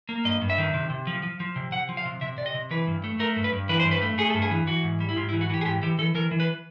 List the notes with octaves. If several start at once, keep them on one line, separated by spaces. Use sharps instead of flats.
A#3
G2 D#5
G2
E5
D#3
C3
C3
F3
F3
F3
C3
C3 F#5
F3
F5
C3
C3 E5
C3 D5
D#5
C3
E3 B4
G2
A3
A3 A#4
G2
B4
G2
E3 B4
C5
G2
B4
A3
A3 G#4
G2 A4
G#4
E3
E3 F#4
G#2
G3
E4
G#2 F4
E4
E3
F#4
E3 G4
G#4
G#2 G4
E3 G4
E3 A4
E3 A#4
E3
B4